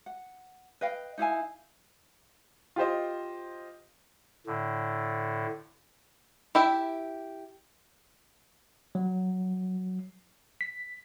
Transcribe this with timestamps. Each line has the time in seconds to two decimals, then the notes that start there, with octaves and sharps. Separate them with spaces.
0.06 F#5
0.81 B4 D#5 F5 G5
1.18 D#4 E4 F5 G#5
2.76 F4 G4 C5 D#5
4.47 A2 D3
6.55 E4 G4 E5
8.95 F#3
10.61 B6